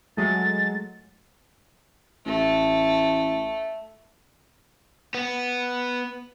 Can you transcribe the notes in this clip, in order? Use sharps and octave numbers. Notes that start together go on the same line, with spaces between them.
F#3 G#3 A3 A6
A1 A3
B3